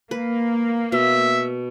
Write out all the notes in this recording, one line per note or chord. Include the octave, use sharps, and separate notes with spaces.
A#3 B4
B2 E5